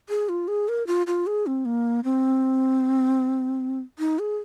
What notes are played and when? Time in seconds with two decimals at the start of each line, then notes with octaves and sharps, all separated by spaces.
0.09 G#4
0.29 F4
0.48 G#4
0.69 A#4
0.87 F4
1.07 F4
1.27 G#4
1.46 C4
1.65 A#3
2.04 C4
3.99 D#4
4.19 G#4